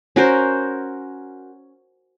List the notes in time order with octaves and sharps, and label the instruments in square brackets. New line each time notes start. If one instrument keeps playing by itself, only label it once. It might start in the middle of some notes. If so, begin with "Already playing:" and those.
[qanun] C#4 F#4 A#4 C5